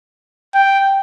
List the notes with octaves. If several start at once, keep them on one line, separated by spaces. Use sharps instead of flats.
G5